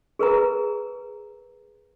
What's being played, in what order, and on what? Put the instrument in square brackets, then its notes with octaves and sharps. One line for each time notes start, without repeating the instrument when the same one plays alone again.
[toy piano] G#4 A#4 B4 A#5